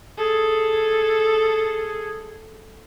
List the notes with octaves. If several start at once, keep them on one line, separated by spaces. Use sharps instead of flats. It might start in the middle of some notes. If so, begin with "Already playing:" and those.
G#4 A4